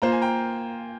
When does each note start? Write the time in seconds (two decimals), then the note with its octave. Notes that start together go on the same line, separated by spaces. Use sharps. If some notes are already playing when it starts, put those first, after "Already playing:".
0.02 A#3 F4 C5 A#5
0.12 G#5
0.22 G5 A#5